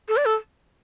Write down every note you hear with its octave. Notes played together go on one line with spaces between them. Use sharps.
A4
D5
A4